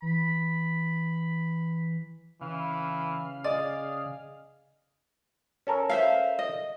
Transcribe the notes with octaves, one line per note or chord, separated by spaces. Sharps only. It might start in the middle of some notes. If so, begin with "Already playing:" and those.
E3 B5
C#3 E3 F5
G#4 D5 D#5
C#4 A4 A#4
C5 E5 F5
D#5